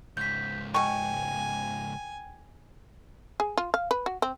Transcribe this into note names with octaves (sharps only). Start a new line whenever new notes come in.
C#2 G#2 G6 B6
B2 G5 G#5 C#6
G#4
F4
F5
B4
F#4
C4